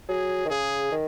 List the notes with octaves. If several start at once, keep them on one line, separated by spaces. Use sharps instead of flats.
F#3 G#4
D#3
C#3 G#4
D#3